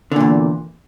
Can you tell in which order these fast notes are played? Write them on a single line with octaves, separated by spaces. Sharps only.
D3 A#2 E2